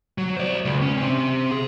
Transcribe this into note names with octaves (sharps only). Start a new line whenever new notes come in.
F#3
C5 D5
C#2
C#4
C3 C4
G#4